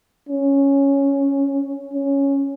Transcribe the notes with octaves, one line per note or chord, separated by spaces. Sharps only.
C#4
C#4